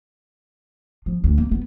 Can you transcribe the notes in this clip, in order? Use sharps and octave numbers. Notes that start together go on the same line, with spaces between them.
F3
D2
A#3
B3